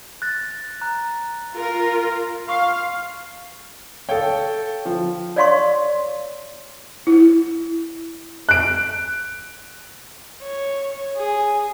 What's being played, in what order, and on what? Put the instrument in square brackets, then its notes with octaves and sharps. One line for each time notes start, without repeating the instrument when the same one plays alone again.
[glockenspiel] F#6 A6 A#6
A#5 F#6
[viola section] F4 A#4
[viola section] F5 [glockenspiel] C6 C#6
[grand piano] A4 G5 [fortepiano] C#5 F5
[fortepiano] F3
[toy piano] C#5 D5 F5 C6 C#6
[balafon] E4
[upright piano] F#6 D7
[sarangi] C#5
G#4